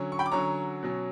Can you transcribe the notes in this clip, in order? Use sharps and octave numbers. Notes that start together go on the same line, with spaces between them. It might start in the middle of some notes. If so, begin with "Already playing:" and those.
Already playing: D3 F#3 C#4
C#6
G5 B5
D6
D3 F#3 C#4 A#5 C#6
B2 F#3 C#4